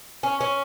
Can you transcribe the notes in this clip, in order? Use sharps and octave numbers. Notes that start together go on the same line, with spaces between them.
C#4
C#4